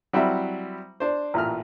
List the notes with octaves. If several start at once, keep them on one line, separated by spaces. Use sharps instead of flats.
F#3 G3 C4 E4 E5
D4 C5
A1 A#2 F6